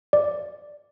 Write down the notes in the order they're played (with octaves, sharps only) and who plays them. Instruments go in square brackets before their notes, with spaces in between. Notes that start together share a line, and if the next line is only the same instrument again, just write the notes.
[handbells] D5